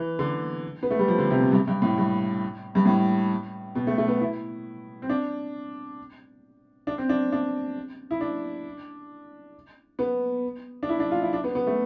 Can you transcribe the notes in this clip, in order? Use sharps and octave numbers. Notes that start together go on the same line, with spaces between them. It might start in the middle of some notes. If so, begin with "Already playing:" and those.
Already playing: E3
D3
B3
A3
G3
F3
D3
C3
B2
G2
G2
A2
G2
G2
A2
B2
A3
A3
B3
E4
C4
D4
D4
C4
D4
D4
E4
D4
B3
D4
E4
D4
F4
E4
D4
B3
B3
A3